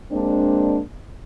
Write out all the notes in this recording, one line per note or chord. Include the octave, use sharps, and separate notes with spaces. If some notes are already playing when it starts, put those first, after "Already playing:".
G#3 A#3 C4 D4